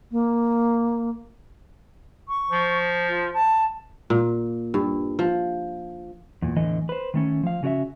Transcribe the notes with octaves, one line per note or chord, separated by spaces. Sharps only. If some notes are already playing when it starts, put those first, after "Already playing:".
A#3
C#6
F3
F4
A5
A#2
G2
F3
E2 A#2
E2 A2 D3 E3 D#5
B4 C5
D#3 A3 C#4
F3 F5
C#3 C#4 F#4 D5 E5